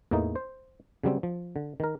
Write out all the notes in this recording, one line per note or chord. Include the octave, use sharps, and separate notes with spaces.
E2 A2 E3 A#3 D#4
C5
C#3 F#3 G3 C4
F3
D3
D#3 A#4